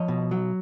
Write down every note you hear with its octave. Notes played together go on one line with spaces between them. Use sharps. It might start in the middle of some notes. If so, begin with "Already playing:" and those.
Already playing: F3 C#5 D#5
B2
F#3